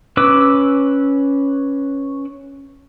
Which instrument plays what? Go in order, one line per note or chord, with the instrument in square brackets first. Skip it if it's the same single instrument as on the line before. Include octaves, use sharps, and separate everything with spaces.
[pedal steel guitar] C#4 B4 D6 E6